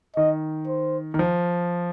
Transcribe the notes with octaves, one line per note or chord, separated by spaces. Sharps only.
D#3 D#5
C5
D#3
F3